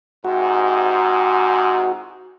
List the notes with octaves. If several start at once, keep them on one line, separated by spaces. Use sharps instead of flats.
G#2 C3 F#4